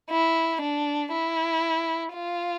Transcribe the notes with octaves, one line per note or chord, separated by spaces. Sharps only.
E4
D4
E4
F4